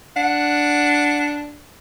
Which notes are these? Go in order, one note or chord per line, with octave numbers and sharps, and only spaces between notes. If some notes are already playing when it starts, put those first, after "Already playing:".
D4 F#5